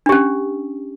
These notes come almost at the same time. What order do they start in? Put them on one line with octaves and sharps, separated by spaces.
D4 G4 C#4